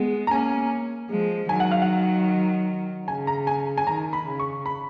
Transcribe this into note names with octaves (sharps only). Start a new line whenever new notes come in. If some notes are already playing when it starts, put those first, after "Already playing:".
Already playing: G#3 B3
A#5
A#3 C#4 G#5
F3 G#3
D#3 F#3 G#5
F#5
F5
F#5
C#3 G#5
A#5
G#5
G#5
D#3 A#5
B5
C#3
C#6
B5